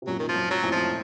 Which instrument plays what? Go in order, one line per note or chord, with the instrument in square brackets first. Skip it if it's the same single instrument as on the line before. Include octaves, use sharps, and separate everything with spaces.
[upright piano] C3
[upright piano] F#2 A#2 [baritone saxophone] F#3
[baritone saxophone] D#3
F3
[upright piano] F#2
[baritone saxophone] F#3
[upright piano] F2 A2
[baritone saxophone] F3